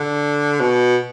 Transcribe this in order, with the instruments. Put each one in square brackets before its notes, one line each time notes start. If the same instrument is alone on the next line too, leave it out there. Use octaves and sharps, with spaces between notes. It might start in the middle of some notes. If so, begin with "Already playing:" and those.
Already playing: [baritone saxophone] D3
B2